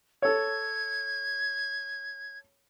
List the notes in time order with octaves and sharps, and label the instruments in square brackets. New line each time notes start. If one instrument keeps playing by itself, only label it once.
[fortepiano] A4 C#5 [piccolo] G#6